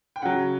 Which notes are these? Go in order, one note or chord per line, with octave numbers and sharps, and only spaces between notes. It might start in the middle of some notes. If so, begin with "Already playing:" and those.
G5
C#3 F#3 F#5